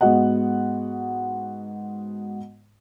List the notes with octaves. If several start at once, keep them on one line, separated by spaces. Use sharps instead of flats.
G#2 B3 F#4 D#5 F#5